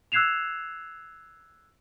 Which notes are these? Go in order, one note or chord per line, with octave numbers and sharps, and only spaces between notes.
E6 F#6 G#6 C7 E7 F7